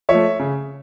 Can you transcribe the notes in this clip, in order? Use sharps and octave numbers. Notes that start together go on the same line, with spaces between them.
F3 C#5 E5
A3
C#3